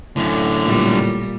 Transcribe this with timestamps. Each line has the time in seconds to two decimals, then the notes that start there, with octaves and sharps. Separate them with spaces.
0.16 F#2 A2 D3
0.64 A#2 G3